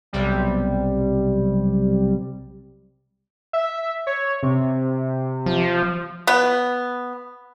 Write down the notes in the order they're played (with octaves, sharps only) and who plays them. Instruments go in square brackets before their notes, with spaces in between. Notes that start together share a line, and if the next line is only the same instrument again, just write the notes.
[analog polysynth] B1 C3 G3
[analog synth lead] E5
C#5
C3
[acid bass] F3
[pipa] B3